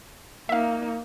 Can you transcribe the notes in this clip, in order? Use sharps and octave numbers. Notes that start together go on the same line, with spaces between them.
A#3 D#4 E5 F5